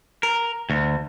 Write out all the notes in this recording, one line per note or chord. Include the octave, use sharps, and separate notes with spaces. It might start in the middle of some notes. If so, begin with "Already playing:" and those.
A#4
D2